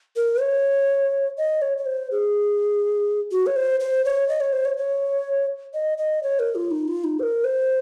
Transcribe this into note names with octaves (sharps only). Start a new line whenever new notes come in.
A#4
C#5
D#5
C#5
C#5
C5
G#4
F#4
C#5
C5
C5
C#5
D#5
C#5
C5
C#5
C#5
D#5
D#5
C#5
A#4
F4
D#4
F4
D#4
C5
A#4
C5